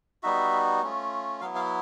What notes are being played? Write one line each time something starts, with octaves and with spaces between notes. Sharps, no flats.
G3 B3 D#4 F#4 E5
A3 C#4 F4
F#3 B3 E4 F5
F5